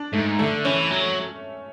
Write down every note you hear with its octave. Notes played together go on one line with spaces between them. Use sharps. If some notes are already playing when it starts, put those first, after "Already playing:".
Already playing: D4
G#2 A3
D3 A3
E3 C#4
F#3